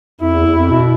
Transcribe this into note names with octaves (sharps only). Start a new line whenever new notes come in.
F2 E4
E2
E2
F2
B2